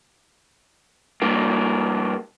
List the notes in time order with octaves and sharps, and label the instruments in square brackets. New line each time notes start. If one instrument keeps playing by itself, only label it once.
[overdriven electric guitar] G2 A#3